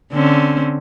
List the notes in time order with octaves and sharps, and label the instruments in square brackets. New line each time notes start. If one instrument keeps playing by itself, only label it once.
[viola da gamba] D3 C4 C#4